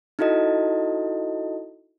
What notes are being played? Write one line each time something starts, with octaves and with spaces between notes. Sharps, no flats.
D#4 E4 F#4 A4 D#5